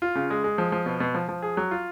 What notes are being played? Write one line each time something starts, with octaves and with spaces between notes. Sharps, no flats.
F4
C#3
G#3
G#3
F3
F3
B2
B2
F3
F3
G#4
F#3
F4